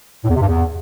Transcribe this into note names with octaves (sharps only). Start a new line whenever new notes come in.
A2
E2
C3
G2
E2